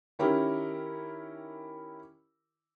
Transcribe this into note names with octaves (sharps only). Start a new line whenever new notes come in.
D#3 C#4 E4 G4 A#4